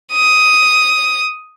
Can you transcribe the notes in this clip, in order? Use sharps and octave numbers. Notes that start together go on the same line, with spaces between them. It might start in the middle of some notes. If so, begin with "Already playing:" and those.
D#6